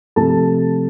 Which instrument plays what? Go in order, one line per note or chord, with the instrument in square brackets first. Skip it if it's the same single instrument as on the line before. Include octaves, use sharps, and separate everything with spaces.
[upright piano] C3 F3 A3 A5